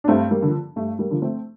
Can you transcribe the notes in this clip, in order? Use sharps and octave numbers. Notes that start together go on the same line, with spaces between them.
D4
G2 A3 C4
G3 A#3
D3
F3
G2 A3
G3 A#3
D3 F3
A3 C4